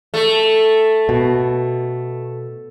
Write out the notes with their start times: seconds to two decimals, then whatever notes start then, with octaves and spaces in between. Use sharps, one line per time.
0.14 A3
1.09 B2